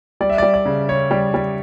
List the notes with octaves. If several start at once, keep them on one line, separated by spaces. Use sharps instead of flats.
G3 D5
E5
G3 D5
D5
C#3
C#3 C#5
G3
G3